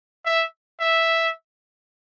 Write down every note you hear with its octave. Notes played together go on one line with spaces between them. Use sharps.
E5
E5